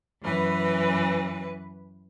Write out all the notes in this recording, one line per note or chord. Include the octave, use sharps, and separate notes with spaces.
F#2 E3 B4